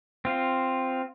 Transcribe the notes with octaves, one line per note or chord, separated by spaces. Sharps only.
C4 F4